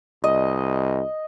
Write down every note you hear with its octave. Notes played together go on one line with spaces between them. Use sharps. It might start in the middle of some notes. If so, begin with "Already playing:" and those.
C2 D#5